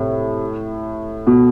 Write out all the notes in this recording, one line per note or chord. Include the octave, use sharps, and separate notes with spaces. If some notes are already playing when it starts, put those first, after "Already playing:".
Already playing: A2 C3
B2